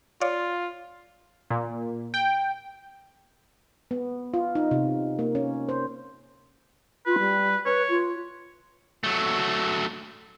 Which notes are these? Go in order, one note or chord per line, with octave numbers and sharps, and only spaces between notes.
F4 C#5 D5 F5
A#2
G5
B3
F4
D#4
C3
A#3
C#4
C5
F4 B4
G3
B4 C#5
F4
F#3 A3